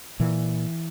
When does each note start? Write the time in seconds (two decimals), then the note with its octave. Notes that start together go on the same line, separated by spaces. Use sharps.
0.20 A#2 E3